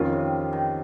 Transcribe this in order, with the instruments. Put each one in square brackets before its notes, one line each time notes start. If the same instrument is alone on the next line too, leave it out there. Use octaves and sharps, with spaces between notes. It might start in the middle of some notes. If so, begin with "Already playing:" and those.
Already playing: [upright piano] F2 D#3 A#3 C#4 F4
[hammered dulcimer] C3
D#3